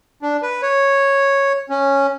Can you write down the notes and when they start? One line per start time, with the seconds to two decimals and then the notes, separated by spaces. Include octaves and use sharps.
0.22 D4
0.43 B4
0.62 C#5
1.70 C#4